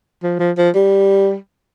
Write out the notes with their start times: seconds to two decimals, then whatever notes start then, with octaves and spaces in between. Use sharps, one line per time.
0.23 F3
0.40 F3
0.58 F3
0.75 G3